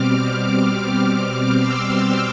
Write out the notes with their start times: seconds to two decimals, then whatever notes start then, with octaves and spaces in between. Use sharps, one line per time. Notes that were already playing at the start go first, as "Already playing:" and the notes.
Already playing: B2 G3 C4 D6 F6
0.25 D6 F6
0.90 D6 F6
1.56 C6 E6